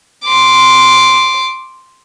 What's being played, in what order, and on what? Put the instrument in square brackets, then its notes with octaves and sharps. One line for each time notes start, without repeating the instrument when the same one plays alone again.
[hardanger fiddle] C6 D6